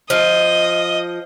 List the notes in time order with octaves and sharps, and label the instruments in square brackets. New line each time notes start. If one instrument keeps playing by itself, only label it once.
[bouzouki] F3 [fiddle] D#5